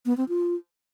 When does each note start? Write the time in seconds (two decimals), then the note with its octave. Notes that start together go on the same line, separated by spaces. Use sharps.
0.06 B3
0.17 C4
0.29 F4